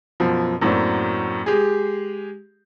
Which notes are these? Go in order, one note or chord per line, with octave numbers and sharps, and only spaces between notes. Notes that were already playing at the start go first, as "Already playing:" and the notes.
F#2 B2 F3
F#2 A2 F#3 A#3 C4 D4
G#3 G4 G#4